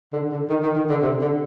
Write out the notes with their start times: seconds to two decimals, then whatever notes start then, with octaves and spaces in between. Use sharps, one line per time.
0.13 D3
0.31 D3
0.49 D#3
0.63 D#3
0.76 D#3
0.89 D3
1.02 C3
1.21 D3